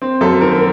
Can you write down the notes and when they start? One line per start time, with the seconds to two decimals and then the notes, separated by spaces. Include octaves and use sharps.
0.02 C4
0.21 F#2 A4
0.41 D#3 A#4
0.56 A#4